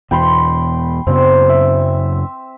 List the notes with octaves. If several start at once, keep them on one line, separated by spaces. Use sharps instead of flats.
E2 B2 G5 B5 C6
F#2 C#3 B3 C4
E5